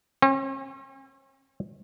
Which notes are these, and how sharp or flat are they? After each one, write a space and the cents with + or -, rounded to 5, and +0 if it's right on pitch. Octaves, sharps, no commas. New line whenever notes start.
C#4 -45